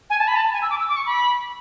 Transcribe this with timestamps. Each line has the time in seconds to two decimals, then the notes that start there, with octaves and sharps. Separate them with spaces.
0.10 G#5
0.19 A5
0.28 B5
0.36 A5
0.53 G#5
0.62 E6
0.70 D6
0.80 E6
0.88 D6
0.96 C#6
1.06 B5